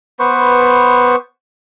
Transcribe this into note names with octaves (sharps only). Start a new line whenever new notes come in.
B3 B4 C5 C#6